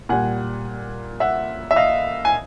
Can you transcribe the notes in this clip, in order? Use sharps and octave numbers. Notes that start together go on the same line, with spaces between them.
A#2 G3 F#5 G#5
E5 F#5
E5
D#5 F5
G#5